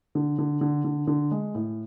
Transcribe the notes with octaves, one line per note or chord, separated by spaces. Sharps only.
D3
D3
D3
D3
D3
G#3
A2